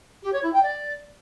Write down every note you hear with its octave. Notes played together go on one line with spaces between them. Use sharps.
G4
C#5
E4
G5
D5